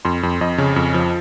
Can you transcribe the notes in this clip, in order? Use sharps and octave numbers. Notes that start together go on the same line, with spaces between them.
F2 C6
F2
F2 D#5
C#3
F2
F3